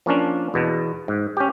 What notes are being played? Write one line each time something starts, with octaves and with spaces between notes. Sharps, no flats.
F3 A#3 C#4 D4
E2 B2
G#2
C#4 G4